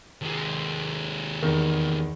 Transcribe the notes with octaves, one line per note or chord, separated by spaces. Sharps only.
D#2 G#3
E2 D#3